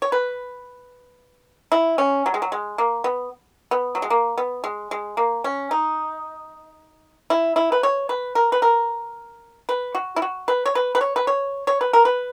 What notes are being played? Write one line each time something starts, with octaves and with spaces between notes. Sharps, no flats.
C#5
B4
E4
C#4
F#3
G#3
F#3
G#3
A#3
B3
B3
F#3
G#3
A#3
B3
G#3
G#3
A#3
C#4
D#4
E4
E4
B4
C#5
B4
A#4
B4
A#4
B4
F#4
E4
F#4
B4
C#5
B4
B4
C#5
B4
C#5
C#5
B4
A#4
B4